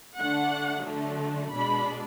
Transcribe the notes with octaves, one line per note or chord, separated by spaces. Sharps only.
D3 A3 D4 F#5
D3 F#3 A3 D4
B2 G#3 D4 B5